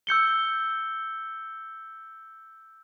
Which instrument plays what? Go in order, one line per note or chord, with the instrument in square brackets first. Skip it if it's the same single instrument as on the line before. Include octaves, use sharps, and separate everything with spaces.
[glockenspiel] E6 G6 C#7 G7